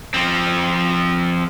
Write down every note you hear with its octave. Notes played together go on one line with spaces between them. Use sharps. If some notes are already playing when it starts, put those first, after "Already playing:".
F3 C4